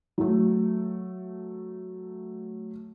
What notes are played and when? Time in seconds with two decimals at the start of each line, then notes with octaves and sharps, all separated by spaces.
0.18 F#3 A3